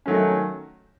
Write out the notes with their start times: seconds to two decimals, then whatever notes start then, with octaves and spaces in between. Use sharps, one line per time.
0.06 D#3 F#3 A3 C#4